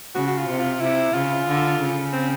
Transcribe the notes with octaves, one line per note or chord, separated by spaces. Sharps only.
C#3 F#4
F#4
F4
C3
F4
C3 E4
C#3 F4
D3
C#3
C4